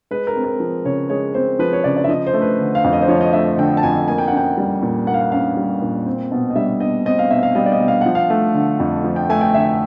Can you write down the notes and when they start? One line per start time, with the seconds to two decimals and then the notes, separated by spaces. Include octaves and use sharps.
0.11 G#3 B4
0.27 A#4
0.36 C4
0.44 A#4
0.60 F3
0.85 C#3 C#5
1.09 G#3 C#5
1.34 C4 C5
1.59 F3 B4
1.73 C#5
1.84 C#3 D5
1.96 D5
2.04 E5
2.09 F3 D#5
2.27 C5
2.34 A3
2.42 B4
2.59 D3
2.75 F5
2.84 F2
2.93 D#5
3.02 C5
3.08 F3 C#5
3.21 D#5
3.33 A3 E5
3.58 D3 G5
3.77 A5
3.83 F2 G#5
4.08 A#3 G#5
4.18 G5
4.28 F#5
4.32 C#4 G5
4.58 G3
4.83 A#2
5.07 A#3 F#5
5.14 F5
5.21 F#5
5.32 C#4 F5
5.57 G3
5.82 A#2
6.06 C4
6.32 B2
6.50 D#5
6.56 G3 E5
6.80 B2 D#5
7.06 C4 D#5
7.19 F5
7.31 B2 E5
7.43 F5
7.55 G3 D#5
7.66 D5
7.72 D#5
7.80 B2
7.88 F5
8.01 F3 F#5
8.15 F5
8.30 A3
8.54 D3
8.80 F2
9.04 F3
9.16 G5
9.30 A3 G#5
9.41 G5
9.54 D3 E5